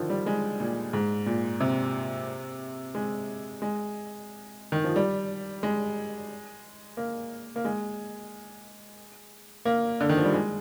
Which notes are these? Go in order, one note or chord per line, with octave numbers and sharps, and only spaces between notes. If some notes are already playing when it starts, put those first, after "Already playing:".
Already playing: D3 D#3 F3
G3
G#3
A#2
G#2
A#2
C3
G#3
G#3
D#3
F3
G3
G#3
A#3
A#3
G#3
A#3
D3
D#3
F3
G3
G#3